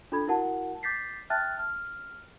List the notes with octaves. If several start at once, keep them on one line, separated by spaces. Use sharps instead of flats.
D4 F4 A4 B5 G#6
E4 F#4 A#4 F#5 A5
D6 G6 A6 B6 C7
E5 G5 A5 F6 F#6 A6
F6